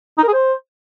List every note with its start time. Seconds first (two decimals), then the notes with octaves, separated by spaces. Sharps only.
0.18 D#4
0.23 A#4
0.28 G#4
0.33 C5